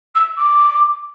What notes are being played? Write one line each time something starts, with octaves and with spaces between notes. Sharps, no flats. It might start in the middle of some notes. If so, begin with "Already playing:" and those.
E6
D6